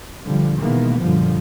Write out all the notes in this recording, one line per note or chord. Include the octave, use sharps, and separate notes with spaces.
B1 D3 F3 G3
B2 D#3 E3 G#3 A#3 B3
F#2 A#2 D3 F3 G3